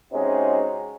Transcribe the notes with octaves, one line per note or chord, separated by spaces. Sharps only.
C3 G#3 C#4 D#4 F#4 G#4